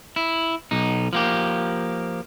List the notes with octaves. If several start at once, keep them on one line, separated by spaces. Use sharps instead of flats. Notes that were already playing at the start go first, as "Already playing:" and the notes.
E4
B1 D#4
F3 A#3 G4